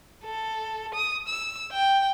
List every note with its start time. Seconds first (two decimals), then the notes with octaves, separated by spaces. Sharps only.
0.24 A4
0.95 D#6
1.27 E6
1.72 G5